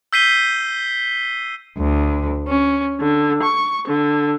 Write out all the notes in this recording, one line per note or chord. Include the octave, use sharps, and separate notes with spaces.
E6 G6 B6 C7 D#7 G7
D2
C#4
D3
C#6
D3